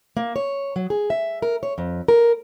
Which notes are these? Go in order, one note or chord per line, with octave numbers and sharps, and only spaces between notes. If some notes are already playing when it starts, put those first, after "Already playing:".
A#3
C#5
F#3
G#4
E5
A#4
C#5
F2
A#4